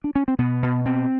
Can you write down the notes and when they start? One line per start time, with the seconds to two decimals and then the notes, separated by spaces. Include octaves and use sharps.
0.04 D4
0.15 C#4
0.28 C4
0.39 B2 B3
0.63 B2
0.85 B2 C4